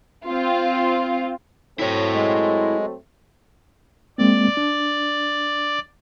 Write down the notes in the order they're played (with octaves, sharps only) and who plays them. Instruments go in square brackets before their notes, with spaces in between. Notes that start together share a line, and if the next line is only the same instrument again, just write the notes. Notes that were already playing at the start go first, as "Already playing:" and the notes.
[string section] C4 F4
[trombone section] F#3 A3 C4 [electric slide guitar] E4 C#5
[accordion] G#3
[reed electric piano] G#3 A#3 C4 [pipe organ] D5
[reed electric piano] D4